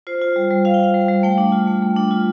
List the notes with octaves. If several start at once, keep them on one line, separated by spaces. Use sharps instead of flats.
F4 C5
F4
G3
G3
F4 F5
G5
F4 F5
G3
G3
A3 G5
D4
F4
A3
A3
D4
F4